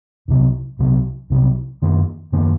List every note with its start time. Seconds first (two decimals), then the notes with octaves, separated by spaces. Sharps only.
0.28 C2 C3 F#3
0.79 C2 C3 F#3
1.30 C2 C3 F#3
1.82 F#2 D#3 A#3
2.32 F#2 D#3 A#3